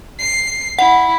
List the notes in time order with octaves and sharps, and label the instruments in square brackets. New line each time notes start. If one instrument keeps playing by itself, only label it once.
[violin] C7
[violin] E4 [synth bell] F#5